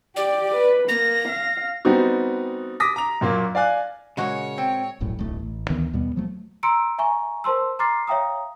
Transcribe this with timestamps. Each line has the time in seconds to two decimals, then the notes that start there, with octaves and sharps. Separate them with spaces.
0.16 G4 D5
0.55 B4
0.89 A#3 A#6
1.29 F5
1.85 G3 B3 C4 D#4 F#4
2.80 D6 D#6 A#6 B6
2.96 A#5 F7
3.21 F#2 A#2 A#3
3.55 D5 F5 G#5 F#6
4.17 A#2 C#3 G#3 F#4 C#5
4.58 C4 G5
5.00 E1 A#1 F#2 A2
5.19 D1 B1 A2 A3
5.39 A1
5.70 D2 D#3 E3 B3
5.93 D#2 B2 G3 B3
6.16 F3 F#3 A3
6.63 A#5 C6 E6 C#7 D7
6.98 E5 G#5 A#5 C#6
7.44 A#4 C5 A5 C6 E6
7.79 A#5 C6 D6 F6 A6 C7
8.07 C#5 E5 F5 G5 A#5 D#6